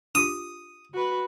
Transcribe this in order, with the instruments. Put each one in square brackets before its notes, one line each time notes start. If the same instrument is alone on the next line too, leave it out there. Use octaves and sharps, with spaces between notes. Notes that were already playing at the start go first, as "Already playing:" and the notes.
[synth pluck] D4 F4 G4 [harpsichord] D#6
[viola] F#4 B4